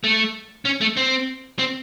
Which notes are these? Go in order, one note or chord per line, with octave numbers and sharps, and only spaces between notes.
A3
C#4
A3
C4
C4